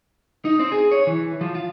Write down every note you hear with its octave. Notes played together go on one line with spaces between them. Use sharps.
D#4
C4
G#4
C#5
E3
F3
F4